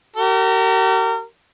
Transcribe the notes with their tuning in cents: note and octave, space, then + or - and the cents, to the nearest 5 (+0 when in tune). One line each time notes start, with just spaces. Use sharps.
G4 -45 A#4 -30